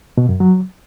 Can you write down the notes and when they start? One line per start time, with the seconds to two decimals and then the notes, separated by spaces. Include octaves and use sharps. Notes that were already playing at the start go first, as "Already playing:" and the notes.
0.18 B2
0.29 F#2
0.40 F#3